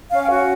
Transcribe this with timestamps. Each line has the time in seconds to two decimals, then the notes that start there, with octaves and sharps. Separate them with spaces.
0.11 C#4 F5
0.22 G5
0.30 F#4 F#5